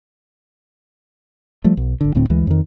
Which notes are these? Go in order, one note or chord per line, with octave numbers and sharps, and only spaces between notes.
F3 G3 A3
B1
G#1 D3
D1 A2 D3 C4
D2 E3 G#3
F2 D#3